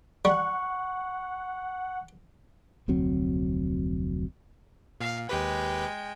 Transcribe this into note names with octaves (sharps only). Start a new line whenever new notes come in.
G3 F#5 C#6
F1 D2 F#3 C4
A#2 F5
D#2 G#3 G4 B4 G5